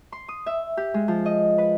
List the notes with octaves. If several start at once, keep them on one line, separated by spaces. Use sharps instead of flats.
C6
D#6
E5
G4
G#3
F3
D#5
B4